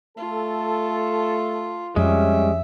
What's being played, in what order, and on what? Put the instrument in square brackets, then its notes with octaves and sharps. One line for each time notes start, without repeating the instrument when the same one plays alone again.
[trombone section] A3 A4 [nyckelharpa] F4
[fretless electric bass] F2 [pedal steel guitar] G3 G#3 [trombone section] C#4 [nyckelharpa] E5